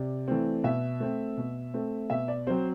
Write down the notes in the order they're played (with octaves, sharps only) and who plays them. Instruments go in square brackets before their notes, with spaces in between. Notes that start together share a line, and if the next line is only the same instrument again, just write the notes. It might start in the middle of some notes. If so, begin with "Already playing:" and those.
Already playing: [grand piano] C3 D5
E3 A3 C4
B2 E5
A3 C4
B2
A3 C4
B2 E5
D5
F#3 C4 C5